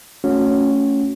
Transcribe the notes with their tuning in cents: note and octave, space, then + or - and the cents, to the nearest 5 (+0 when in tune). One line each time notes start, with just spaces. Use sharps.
A3 +10 C#4 +0 F#4 -25